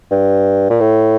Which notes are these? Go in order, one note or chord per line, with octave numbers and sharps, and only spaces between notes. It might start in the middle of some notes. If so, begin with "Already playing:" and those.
G2
A#2
A2